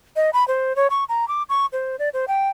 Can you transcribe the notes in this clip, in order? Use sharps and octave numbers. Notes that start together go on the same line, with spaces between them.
D#5
B5
C5
C#5
C#6
A#5
D6
C#6
C5
D5
C5
G5